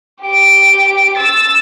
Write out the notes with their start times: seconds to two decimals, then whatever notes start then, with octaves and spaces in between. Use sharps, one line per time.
0.23 G4 D7
1.17 E6 A6